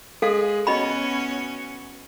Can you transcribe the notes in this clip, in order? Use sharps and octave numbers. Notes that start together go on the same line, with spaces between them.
G#3 G#4 A4 F5
B3 C#4 F#4 C#5 D#5 B5